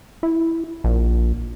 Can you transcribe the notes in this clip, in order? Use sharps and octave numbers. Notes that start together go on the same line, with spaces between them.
E4
A#1